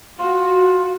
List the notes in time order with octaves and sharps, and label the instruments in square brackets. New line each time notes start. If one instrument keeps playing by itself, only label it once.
[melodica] F4 [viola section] F#4